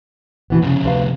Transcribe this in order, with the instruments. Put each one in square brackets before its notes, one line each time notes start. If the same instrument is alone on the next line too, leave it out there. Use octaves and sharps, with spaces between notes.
[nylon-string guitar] B2 E3 B3
[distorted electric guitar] C2 F2 [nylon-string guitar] C#3
[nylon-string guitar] D2 B4 F5